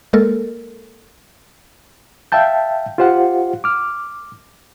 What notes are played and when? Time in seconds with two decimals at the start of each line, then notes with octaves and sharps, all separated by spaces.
0.13 G#3 A#3 A4 A#4
2.32 E5 F5 G5 A5 G6
2.98 F4 G4 C5 F5 F#5
3.64 D6 F6